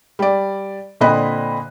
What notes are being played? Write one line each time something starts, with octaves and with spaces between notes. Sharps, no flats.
G3 D5
A#2 D3 C4 D#5 B5 F#6